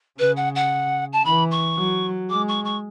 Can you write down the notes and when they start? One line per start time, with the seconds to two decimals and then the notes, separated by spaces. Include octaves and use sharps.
0.19 C#3 B4
0.37 F#5
0.55 F#5
1.13 A5
1.25 E3 B5
1.51 C#6
1.78 F#3
2.30 G#3 D6
2.48 C#6
2.65 C#6